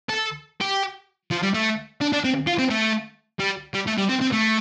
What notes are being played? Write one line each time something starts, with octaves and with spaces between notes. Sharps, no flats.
A4
G4
F3
G3
A3
D4
D4
C4
F4
C4
A3
G3
G3
A3
G3
C4
C4
A3